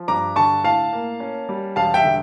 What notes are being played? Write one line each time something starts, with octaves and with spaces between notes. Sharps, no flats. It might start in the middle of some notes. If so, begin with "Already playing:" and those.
Already playing: F3
G2 A#5 D6
D3 A5 C#6
A2 F5 A5
A#3
C#4
G3
E1 F5 A5
E5 G5
D3